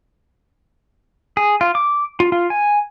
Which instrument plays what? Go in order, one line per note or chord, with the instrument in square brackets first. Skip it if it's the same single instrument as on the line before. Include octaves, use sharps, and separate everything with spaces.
[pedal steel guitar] G#4
F4
D6
F4
F4
G#5